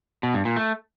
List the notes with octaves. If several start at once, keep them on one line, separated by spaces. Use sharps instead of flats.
B2
G2
A#2
A3